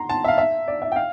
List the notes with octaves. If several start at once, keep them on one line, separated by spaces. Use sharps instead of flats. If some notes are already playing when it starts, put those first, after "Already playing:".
Already playing: A#5 C6
A5
E5
F5
E5
D5
E5
G5
F5